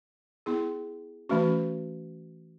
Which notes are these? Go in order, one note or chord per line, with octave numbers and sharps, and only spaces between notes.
B3 E4 G#4
E3 A3 C#4 F#4